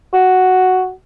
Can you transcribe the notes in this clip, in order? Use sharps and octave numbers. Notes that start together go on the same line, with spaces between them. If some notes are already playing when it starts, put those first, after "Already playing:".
F#4